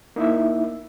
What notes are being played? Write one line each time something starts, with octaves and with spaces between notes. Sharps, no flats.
A#3 D#4 E4 E5